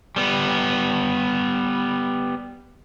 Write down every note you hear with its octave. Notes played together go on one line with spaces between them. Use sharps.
G3 B3